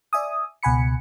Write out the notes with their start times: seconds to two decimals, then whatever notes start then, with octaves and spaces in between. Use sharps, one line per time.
0.13 D5 E5 G#5 D#6
0.63 C#2 B2 F#5 G#5 B5 C#7